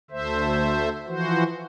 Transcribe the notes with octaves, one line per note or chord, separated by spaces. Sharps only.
D2 A3 C5 E5
E3 F3 F#4 C5